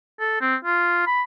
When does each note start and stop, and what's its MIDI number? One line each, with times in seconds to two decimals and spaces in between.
0.20 0.39 69
0.41 0.56 60
0.65 1.03 65
1.07 1.22 83